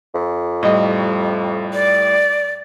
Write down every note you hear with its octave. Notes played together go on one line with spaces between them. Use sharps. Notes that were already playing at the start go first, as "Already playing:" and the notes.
F2
A2 G3 D#5
D5